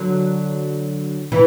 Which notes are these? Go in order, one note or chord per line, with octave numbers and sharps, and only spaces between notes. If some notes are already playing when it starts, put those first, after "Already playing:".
Already playing: D3 F#3
E3